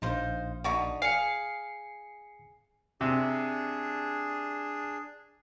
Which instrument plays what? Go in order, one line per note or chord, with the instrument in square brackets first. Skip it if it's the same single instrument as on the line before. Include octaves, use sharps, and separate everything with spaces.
[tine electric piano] A#1 [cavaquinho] D#4 C5 F5
[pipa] D3 F#4 [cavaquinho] D#4 E4 B5
[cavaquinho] G#4 [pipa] F5 [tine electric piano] C7 C#7
[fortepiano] C3 [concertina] D4 G#4